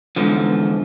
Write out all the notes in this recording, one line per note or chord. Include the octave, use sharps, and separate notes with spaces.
E2 G#2 D3 F3